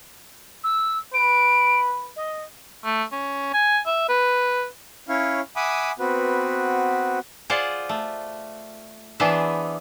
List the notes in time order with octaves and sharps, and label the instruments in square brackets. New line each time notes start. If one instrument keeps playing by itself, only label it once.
[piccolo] E6
[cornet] B4 [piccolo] D7
[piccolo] D#5
[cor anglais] A3
C#4
G#5
E5
B4
[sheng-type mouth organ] C#4 E4 C#5 F5
E5 F#5 G#5 B5 D6 D#6
B3 C4 F#4 B4
[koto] F4 G#4 C5 D5 F#5
A3
E3 B3 D4 G#4 C5 E5